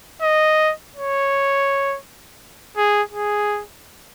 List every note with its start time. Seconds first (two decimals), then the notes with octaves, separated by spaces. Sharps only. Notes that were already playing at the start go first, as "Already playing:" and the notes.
0.22 D#5
0.96 C#5
2.77 G#4
3.12 G#4